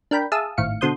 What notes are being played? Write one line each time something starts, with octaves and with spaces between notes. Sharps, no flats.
D4 A#4 G5 B5
G#4 E5 F5 A5 D#6 E6
G#1 A2 F5 C#7
B2 D3 C5 C6 D#6 G6